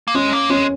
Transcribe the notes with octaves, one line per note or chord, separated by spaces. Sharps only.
A#3
G#3 C#4
A#3
G#3 C#4